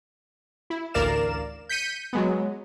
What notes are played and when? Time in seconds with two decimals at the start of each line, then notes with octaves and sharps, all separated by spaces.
0.70 E4
0.94 A1 D2 A#4 D5 F5 E7
1.69 G6 B6 C#7 D#7
2.13 F#3 G#3 B3